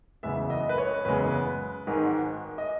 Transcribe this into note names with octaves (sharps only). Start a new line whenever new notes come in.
F#1 E2 C#3 G#3 B3 E5
D#5
B4
C#5
F#1 E2 C#3 G#3 B3 B4
G#1 G#2 D#3 G#3
D#5